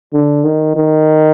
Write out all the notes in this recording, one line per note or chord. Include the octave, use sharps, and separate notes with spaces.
D3
D#3
D#3